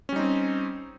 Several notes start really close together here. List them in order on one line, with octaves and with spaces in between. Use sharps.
C#4 G3 D#4 C4